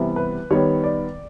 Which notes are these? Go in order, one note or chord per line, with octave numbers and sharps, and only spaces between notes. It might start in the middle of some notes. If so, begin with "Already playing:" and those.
Already playing: C3 E3 G3 B3
B4
D#3 G3 B3 C#5
D5